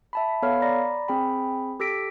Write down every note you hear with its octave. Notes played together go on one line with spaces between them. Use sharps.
E5 A5 B5
B3 A4 C#5 F5 B5 F6
D5 A#5 B5 A#6
C4 G#4 G5 B5
G4 A4 E6 A#6 B6 D7